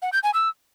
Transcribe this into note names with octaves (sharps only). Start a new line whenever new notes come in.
F#5
G6
G#5
E6